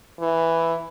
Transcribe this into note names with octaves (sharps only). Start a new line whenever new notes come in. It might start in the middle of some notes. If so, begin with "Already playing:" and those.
E3